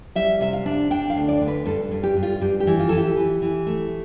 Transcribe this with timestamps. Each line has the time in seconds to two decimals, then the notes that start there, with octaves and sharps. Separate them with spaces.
0.16 G3 E5
0.41 C3 E5
0.53 F5
0.66 D4
0.91 D4 G5
1.10 F5
1.16 D2
1.29 D5
1.41 D2
1.47 B4
1.66 G2 A4
1.91 G2
2.03 G4
2.17 G2
2.23 F4
2.41 G2 G4
2.60 G4
2.67 E3
2.79 F4
2.89 E3 A4
2.98 G4
3.17 E3
3.42 E3
3.67 A3